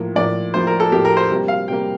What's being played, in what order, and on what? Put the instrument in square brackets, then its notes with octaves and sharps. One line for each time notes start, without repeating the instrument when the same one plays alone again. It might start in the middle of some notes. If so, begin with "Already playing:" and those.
Already playing: [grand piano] A2 F3 A#3
A2 F3 A#3 D5
A2 F3 A#3 C5
A#4
A4
A2 F3 A#3 G4
A#4
C5
C3 G3 A#3
F5
C3 G3 A#3 G5